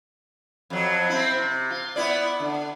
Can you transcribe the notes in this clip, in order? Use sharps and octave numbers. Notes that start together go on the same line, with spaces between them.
F2 F#3
C4 E4
C3
F4
B3 E4 D5
D3